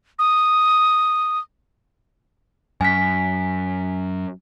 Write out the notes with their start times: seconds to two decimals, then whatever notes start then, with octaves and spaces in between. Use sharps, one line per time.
0.19 D#6
2.81 F#2 G#5 B6